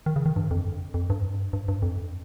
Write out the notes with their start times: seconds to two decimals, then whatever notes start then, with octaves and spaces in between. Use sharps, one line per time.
0.06 D#3
0.16 C#3
0.26 D#3
0.36 G2
0.51 F2
0.94 F2
1.10 G2
1.53 G2
1.68 G2
1.82 F2